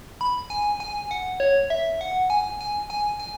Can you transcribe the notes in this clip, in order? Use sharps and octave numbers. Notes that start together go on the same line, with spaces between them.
B5
G#5
G#5
F#5
C#5
E5
F#5
G#5
G#5
G#5
G#5